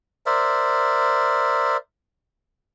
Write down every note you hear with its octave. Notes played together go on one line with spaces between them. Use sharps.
A#4 C5 D5 E5